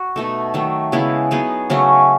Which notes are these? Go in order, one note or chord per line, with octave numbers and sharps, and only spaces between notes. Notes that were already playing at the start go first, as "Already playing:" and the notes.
Already playing: F#4
B2 A3 D#4 A4
D#3 F#3 A3
C#3 G#3 B3 E4
F#3 B3 D#4 G#4
C#3 F#3 A3 C#4